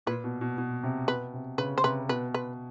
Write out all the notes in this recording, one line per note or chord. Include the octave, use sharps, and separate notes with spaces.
A#2 B4
B2
B2
B2
C3
B2 B4
C3
C#3 B4
C5
C3 B4
B2 B4
B4